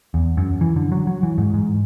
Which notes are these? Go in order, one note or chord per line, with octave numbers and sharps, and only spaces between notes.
E2
F#2
E3
D3
F#3
F#3
E3
G#2
G#2